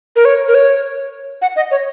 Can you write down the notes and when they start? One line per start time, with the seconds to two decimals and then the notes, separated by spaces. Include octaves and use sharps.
0.16 A#4
0.25 C#5
0.48 A#4
0.55 C#5
1.42 F#5
1.56 D#5
1.71 C#5